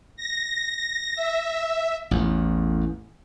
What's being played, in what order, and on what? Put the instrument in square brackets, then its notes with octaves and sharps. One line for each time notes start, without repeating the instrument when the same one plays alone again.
[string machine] A#6
E5
[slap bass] A1 E2